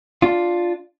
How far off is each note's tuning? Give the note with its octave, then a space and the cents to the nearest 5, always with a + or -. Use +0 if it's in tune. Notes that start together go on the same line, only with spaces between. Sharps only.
D4 +0 F4 +5